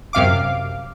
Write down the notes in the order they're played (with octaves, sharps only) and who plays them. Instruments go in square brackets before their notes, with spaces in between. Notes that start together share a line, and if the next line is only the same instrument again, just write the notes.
[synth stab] F#2 C3 F5 D6